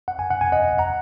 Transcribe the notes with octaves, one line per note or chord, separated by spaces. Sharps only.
F#5
G#5
F#5
G#5
D#5 F#5
F#5 A#5